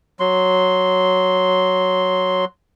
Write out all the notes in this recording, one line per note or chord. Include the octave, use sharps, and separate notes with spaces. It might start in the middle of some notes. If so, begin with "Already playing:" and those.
F#3 C6